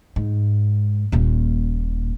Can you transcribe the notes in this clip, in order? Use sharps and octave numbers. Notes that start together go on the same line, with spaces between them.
G#2
D#1 A#2